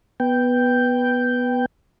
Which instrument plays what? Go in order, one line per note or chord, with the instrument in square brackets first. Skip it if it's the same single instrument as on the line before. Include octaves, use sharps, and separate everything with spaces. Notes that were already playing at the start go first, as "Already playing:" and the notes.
[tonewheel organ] B3 G5